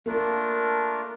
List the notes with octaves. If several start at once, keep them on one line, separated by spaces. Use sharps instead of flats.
A3 A#3 D4 F4 A#4